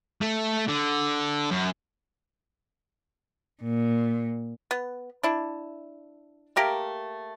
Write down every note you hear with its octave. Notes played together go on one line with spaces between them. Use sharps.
A3
D3
F#2
A#2
B3
D4 E4
A3 A#3 G4 A#4